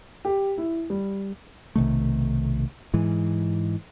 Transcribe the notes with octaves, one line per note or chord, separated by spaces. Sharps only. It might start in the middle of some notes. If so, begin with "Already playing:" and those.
G4
E4
G3
B1 C3 D#3 A3
G#2 E3